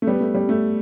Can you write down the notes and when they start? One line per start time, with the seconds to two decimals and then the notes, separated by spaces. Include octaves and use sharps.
0.02 A3
0.07 G3 B3
0.21 A3
0.35 G3
0.49 A3